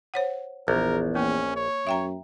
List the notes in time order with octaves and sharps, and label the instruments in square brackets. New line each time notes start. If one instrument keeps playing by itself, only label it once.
[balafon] C5 C#5 F#5
[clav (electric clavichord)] A#1 [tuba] E2 [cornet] A#4
[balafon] A#3 [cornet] C#4
[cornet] C#5
[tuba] F#2 [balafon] E5 G5 A#5